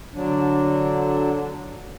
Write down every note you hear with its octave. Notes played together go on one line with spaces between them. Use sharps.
D3 F#3 D4